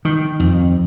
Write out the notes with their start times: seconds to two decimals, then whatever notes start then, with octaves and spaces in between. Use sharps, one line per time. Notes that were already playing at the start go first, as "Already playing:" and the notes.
0.05 D#3
0.40 F2